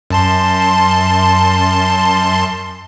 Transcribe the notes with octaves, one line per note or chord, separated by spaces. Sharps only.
F#2 A5 C6